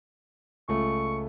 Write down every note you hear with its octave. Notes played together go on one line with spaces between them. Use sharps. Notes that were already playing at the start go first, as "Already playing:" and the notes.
C#2 A3 C#6